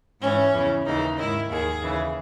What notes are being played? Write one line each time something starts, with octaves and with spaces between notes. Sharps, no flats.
G#2 E3 C#4
E2 C#3 E3
D#2 C#3 E3 D#4
G#2 D#3 E4
D#2 D#3 G#4
D#2 C#3 E3